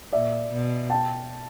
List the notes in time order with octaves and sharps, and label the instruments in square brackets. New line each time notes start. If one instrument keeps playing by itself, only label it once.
[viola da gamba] A#2 [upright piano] D5 E5
[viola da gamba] B2
[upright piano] G5 A5